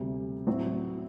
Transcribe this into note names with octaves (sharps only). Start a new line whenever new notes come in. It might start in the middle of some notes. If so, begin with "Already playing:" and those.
Already playing: D2 C3 G3
A2 F#3 C4 F#4